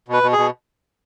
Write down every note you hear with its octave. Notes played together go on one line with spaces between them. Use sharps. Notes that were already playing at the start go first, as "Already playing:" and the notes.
B2 B4
B2
G#4
B2